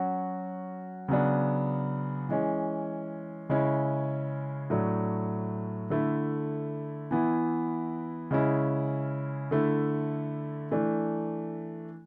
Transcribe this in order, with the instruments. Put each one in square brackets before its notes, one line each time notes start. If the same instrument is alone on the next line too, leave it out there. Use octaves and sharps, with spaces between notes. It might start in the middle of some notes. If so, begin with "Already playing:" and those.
Already playing: [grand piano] F#3 C#4 F#4
C#3 F#3 B3 D4
E3 G#3 C#4
C#3 G#3 C#4 E4
A2 F#3 A3 D4
D3 A3 E4
E3 B3 E4
C#3 G#3 C#4 E4
D3 A3 E4
E3 A3 D4